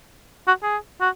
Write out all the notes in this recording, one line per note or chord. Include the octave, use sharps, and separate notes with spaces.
F#4
G#4
F#4